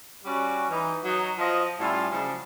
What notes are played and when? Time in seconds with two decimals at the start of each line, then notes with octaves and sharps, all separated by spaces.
0.25 G3 C#4 F#4
0.70 E3 D#4
1.05 F#3 D#4
1.39 F3 D#5
1.79 A2 G3 C#4 E4 F4
2.12 C#3 F3 F#3 G#3 D4